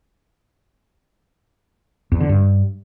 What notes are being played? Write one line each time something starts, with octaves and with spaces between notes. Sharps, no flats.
E2
D3
G2